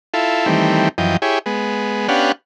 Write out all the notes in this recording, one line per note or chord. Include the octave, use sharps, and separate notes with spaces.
E4 F4 A4
D#3 E3 G3 A3 C4
F#2 E3 F3 D#5 G5
E4 G4 G#4 C#5
G#3 B3
B3 C#4 D4 G4 F5 F#5